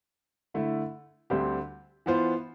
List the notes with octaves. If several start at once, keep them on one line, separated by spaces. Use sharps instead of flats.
D3 A3 E4
D2 D3 G3 C4 G4
E3 B3 F4 C5